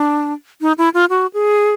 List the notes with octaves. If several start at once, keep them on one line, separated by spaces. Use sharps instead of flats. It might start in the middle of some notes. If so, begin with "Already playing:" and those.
Already playing: D4
D#4
E4
F4
F#4
G#4